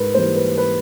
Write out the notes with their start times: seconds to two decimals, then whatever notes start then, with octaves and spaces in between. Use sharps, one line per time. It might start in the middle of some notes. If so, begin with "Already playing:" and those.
Already playing: G#2 A#4 B4
0.14 E3 G3 A#3 C5
0.36 B4
0.58 B4